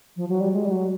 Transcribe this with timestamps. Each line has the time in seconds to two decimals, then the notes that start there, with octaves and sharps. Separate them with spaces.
0.16 F3
0.29 F#3
0.40 G3
0.53 G#3
0.65 G3
0.71 F#3